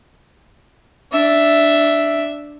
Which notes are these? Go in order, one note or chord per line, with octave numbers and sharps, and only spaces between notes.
D4 E5